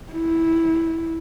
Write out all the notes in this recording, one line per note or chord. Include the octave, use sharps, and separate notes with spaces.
E4